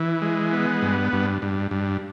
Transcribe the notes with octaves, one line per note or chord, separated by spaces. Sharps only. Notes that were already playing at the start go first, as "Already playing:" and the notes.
Already playing: E3
G#3
B3
G2
G2
G2
G2